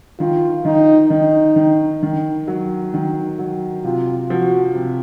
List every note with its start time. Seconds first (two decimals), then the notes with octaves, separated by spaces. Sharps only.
0.19 D#3 F4
0.65 D#3 D#4
1.10 D#3 D#4
1.56 D#3
2.03 D#3
2.47 F#3
2.94 D#3
3.39 F#3
3.84 C3 F4
4.30 F3 F#4
4.75 C3